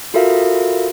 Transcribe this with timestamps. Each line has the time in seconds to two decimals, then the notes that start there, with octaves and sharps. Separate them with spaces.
0.14 F4 F#4 A4 A#4 E5 F5